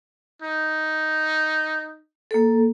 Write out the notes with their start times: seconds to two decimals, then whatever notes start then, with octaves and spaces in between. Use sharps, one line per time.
0.42 D#4
2.31 A#3 A4